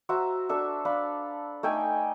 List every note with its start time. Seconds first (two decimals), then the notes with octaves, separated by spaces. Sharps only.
0.09 F#4 C5 E5 A#5
0.49 D4 A4 E5
0.85 D4 F5 B5
1.63 A3 D#4 G5 G#5